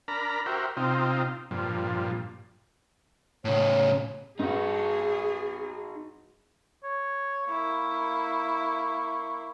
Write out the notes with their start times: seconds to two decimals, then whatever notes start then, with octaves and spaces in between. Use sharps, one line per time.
0.08 D4 A#4 A#5 B5
0.46 F#4 G4 A#4 C5 E5
0.77 C3 C4 D#4 F4
1.51 G2 A#2 F3
3.45 A2 C#3 C#5
4.39 G2 D#4 F#4 G#4
6.84 C#5
7.46 A#3 E4 C#6